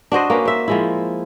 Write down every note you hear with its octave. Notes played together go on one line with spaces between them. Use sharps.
D4 F#4 C5 D#5
A#3 C#4 B4
C5 E5
F3 G#3 E4